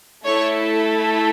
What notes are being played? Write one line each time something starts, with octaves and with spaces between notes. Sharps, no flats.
A3 E4 A4 C#5 C#6